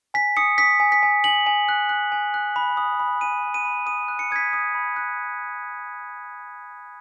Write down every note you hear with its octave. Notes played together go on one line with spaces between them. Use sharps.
G#5 B6
D#6 C#7
D#6 B6
G#5
B6
G#5
G#5 F#7
G#5
F#6
F#6
G#5
F#6
B5
D#6
B5
G#5 D#7
B5
D#7
B5
D#6 D#7
F#6
C#7
D#6 G#6
B6
D#6
B5
F#6